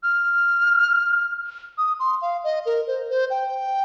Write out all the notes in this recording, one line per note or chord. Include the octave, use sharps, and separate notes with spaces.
F6
D#6
C6
F5
D#5
A#4
C5
C5
G5